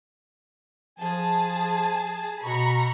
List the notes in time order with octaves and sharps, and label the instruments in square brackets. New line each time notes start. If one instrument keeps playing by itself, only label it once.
[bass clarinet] F3 [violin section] G#4 A5
[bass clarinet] B2 [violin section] A#5 B5 C#6